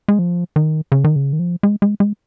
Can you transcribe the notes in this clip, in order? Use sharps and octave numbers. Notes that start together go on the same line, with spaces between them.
G#3
F3
D#3
C#3
D#3
C#3
D#3
F3
G#3
G#3
G#3